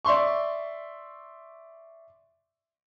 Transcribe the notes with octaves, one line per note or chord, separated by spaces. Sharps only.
D5 E5 C6 C#6